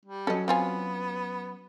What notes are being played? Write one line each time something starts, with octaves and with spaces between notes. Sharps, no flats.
G3
F#3 C#4 A4 D#5
B3 C4 F4 G#5